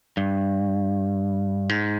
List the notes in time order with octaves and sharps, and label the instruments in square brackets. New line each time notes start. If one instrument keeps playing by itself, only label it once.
[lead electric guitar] G2
G#2